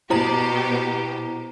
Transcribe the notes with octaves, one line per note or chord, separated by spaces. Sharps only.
B2 E4 G4 C5 A#5